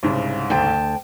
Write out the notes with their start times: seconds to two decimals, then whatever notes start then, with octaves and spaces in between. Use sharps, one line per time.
0.03 C2 G#2 C#3
0.50 D2 G5 A5